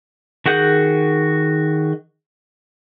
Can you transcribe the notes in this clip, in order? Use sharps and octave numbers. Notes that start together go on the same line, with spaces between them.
D#3 F#4 G#4 F#5 G6